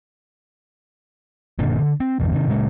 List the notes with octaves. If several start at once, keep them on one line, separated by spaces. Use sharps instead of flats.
F#1 A#2 D3 D4
D3
C4
G1 E2 B2
C3 D#3
A#2 C#3 E3 G#3